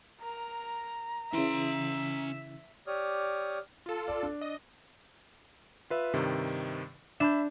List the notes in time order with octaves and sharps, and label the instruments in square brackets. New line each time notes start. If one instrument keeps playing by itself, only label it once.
[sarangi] A#4 [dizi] A#5
[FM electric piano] C#3 E3 [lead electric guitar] C#4 C6 [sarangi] E5
[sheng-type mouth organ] G4 C#5 D5 D#6 F6
[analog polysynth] F4 A4
[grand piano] D5
D4
[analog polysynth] D#5
[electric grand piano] F4 B4 E5
G2 C3 D#3
[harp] D4 E7 [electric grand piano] E5 B5 G6